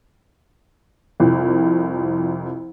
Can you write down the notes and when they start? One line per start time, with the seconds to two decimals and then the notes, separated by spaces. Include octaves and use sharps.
1.20 C2 F2